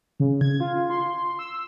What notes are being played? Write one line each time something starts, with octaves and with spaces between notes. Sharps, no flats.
C#3
G#6
F4
C6
E6